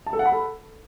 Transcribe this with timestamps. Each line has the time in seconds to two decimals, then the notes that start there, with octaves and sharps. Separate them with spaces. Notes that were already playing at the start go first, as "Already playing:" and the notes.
0.06 A5
0.13 A4
0.19 F#5
0.26 B5
0.32 A4